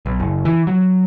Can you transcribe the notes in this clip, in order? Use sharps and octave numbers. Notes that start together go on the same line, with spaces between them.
B1
F#1
E3
F#3